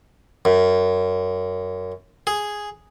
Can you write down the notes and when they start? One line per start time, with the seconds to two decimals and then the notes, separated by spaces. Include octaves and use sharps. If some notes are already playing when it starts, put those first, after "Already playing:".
0.45 F#2
2.27 G#4